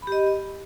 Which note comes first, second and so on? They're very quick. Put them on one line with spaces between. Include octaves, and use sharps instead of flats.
B5 G4 D#5